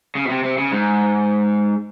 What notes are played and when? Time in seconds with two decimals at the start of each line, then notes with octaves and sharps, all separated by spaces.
0.15 C#3
0.25 B2
0.30 C3
0.44 C3
0.58 C#3
0.72 G#2